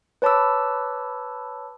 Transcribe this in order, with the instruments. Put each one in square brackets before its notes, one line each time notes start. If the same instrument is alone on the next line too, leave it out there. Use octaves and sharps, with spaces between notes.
[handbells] B4 C#5 A5 B5 D6 E6